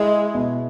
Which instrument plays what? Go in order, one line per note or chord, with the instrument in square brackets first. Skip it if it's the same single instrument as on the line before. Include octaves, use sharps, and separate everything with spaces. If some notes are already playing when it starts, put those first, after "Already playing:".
Already playing: [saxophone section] G#3 [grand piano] E4
[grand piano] B2